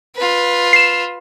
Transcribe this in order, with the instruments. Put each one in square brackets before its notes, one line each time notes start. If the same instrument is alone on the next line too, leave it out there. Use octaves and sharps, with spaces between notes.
[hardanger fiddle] F4 B4
[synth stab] C7 E7